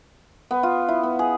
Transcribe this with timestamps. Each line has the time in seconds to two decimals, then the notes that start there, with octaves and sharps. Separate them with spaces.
0.51 B3
0.63 F4
0.88 E4
1.03 B3
1.19 G#4